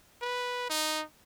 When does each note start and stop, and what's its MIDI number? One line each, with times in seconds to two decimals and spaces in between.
0.22 0.69 71
0.70 1.04 63